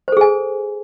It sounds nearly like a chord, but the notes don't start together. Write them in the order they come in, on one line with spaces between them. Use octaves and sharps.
C5 A4 G#4 G#5